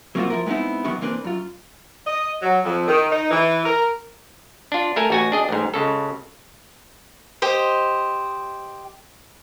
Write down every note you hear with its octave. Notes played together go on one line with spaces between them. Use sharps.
F#3 A#3 C4 D4 F4 F#4
F3 E4 A#4
G#3 B3 C4 D#4 E4
D#3 E3 F#3 B3 D4 E4
E3 A#3 C4 D4 B4
F#2 F4
D#5
F#3
F2
D#3
D#4
E3
A#4
D4 F4
A3 A4 A#4 G#5
A1 F#4 G#5
D4 G#4 D#5
A1 G#2
C#2 C#3 A4
G4 C5 D#5